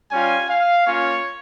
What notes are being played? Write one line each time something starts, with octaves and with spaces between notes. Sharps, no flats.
G3 C#4 F4 G#5
F5
A#3 C#4 F4 C#5